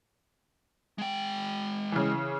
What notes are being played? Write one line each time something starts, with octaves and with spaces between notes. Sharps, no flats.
G#3 G5
C#3 E3